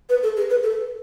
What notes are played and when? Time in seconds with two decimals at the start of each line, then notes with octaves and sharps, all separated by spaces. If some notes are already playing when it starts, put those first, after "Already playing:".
0.10 B4
0.23 A4
0.37 G#4
0.50 B4
0.64 A4